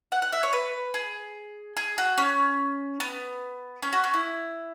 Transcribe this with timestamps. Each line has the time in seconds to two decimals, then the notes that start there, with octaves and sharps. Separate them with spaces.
0.12 F#5
0.22 F#5
0.32 E5
0.43 C#5
0.53 B4
0.94 G#4
1.77 G#4
1.98 F#4
2.18 C#4
3.00 B3
3.82 C#4
3.93 F#4
4.04 C#4
4.14 E4